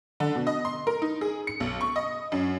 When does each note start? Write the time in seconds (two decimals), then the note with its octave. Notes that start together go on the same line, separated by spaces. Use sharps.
0.20 D3
0.35 B2
0.47 D#5
0.65 C6
0.87 A#4
1.02 D#4
1.21 G#4
1.47 C#7
1.60 B1
1.81 C#6
1.96 D#5
2.32 F#2